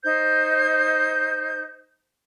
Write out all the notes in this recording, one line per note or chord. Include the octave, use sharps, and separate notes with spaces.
D#4 C5 G6